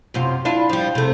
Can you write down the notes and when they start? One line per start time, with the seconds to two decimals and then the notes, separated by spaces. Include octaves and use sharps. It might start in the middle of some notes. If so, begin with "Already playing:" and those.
0.14 F#2 C3 F4
0.45 D4 E4 F4
0.69 F3 G3
0.95 C3 A3